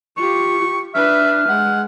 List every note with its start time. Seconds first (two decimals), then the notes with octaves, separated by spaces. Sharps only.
0.17 F4 G4 C#6
0.94 D4 B4 E5 F6
1.49 G#3 F#5